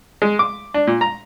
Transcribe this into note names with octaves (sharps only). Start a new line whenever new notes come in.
G#3
D6
D4
A#2
A#5